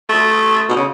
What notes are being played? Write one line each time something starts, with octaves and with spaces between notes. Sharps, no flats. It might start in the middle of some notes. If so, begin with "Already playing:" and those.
A3
B2
C#3